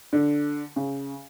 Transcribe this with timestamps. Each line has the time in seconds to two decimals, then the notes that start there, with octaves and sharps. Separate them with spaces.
0.13 D3
0.76 C#3